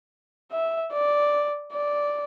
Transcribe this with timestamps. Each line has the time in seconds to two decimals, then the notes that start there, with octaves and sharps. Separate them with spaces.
0.52 E5
0.92 D5
1.72 D5